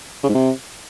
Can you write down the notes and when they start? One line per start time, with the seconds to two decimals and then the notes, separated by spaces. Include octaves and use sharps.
0.23 C#3
0.29 G#2
0.35 C3